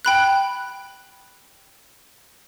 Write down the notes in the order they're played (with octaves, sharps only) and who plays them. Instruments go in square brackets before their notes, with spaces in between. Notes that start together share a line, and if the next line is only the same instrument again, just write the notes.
[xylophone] G5 B5 F#6